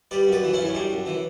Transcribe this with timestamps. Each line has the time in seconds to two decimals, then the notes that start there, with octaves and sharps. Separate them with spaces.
0.11 G3 B4 D5
0.27 F#2
0.32 B4 D5
0.44 E3
0.53 C#4 E4
0.59 F#2
0.65 C#4
0.75 G3 D4
0.91 F#2
1.06 E3